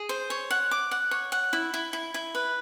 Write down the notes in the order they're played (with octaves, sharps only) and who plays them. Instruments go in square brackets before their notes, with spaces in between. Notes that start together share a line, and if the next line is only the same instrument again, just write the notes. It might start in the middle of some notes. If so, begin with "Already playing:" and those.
Already playing: [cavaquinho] G#4
C5
C#5
F#5
D6
F#5
C#5
F#5
E4
E4
E4
E4
B4